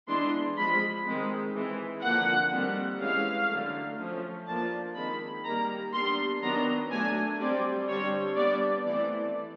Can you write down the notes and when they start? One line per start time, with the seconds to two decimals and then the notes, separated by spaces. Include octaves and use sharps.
0.08 E3 G#3 B3 D4 C6
0.57 F3 G#3 C4 B5
1.06 D#3 G#3 C4
1.55 E3 G#3 C4
2.03 D3 F3 A#3 F#5
2.52 D#3 G3 C4
3.01 E3 G#3 C#4 F5
3.49 D3 F#3 A3
3.99 F3 A3 C#4
4.47 F3 A#3 D4 A5
4.95 D#3 G#3 C4 B5
5.44 D#3 G3 A#3 A#5
5.93 G3 B3 D4 C6
6.43 D#3 F#3 B3 D4 A#5
6.91 F#3 A3 D4 G#5
7.40 G3 C4 D5
7.88 D3 G3 C4 C#5
8.37 G3 B3 D4 D5
8.85 E3 A3 C4 D5